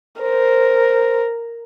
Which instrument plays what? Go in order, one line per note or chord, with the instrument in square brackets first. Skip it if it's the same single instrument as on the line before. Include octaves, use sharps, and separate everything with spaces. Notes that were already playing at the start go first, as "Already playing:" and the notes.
[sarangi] A#4 [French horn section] C5